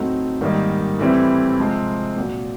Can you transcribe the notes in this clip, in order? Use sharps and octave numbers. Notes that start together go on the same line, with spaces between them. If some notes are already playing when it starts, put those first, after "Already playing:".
Already playing: A2 F#3 A3 C4 D#4
G#2 D#3 G3 A#3 D#4
A2 E3 G3 C4 E4
C3 F3 G#3 C4
A#2 F#3 A#3